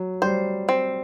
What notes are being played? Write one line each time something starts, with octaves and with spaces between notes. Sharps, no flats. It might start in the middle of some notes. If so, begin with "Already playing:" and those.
Already playing: F#3
G3 C5
C4